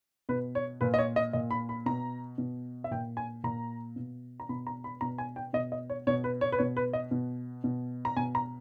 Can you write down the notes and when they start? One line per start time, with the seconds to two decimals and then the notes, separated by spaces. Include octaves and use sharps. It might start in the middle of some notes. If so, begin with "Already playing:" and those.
0.29 B2 B4
0.55 C#5
0.81 A#2 B4
0.94 D#5
0.98 C#5
1.16 D#5
1.33 A#2 D#5
1.51 B5
1.69 B5
1.86 B2 A#5
2.38 B2
2.84 E5
2.91 A#2 G5
3.17 G#5
3.44 A#2 A#5
3.96 B2
4.40 A#5
4.49 B2 B5
4.67 A#5
4.84 B5
5.01 B2 A#5
5.18 G#5
5.36 G5
5.53 B2 D#5
5.72 D#5
5.90 C#5
6.07 B2 C#5
6.24 B4
6.41 C#5
6.52 B4
6.58 B2 C#5
6.77 B4
6.93 D#5
7.11 B2
7.64 B2
8.05 A#5
8.16 B2 G#5
8.35 A#5